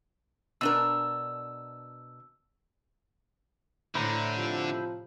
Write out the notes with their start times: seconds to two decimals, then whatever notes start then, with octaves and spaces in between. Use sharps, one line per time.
0.61 B2 D4 A#4 E6
3.95 A2 D3 E4 C5 A#5
4.36 C3 F3 F4